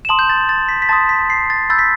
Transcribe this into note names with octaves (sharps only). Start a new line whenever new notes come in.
E7
A5 C6 D#6 F#7
G6
A6
A6
B6
B6
A5 C6 D#6 A6
B6
C7
A6
B5 E6 G6 A6
B6